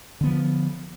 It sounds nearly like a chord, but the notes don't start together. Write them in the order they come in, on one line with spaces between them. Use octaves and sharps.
D3 B3 F3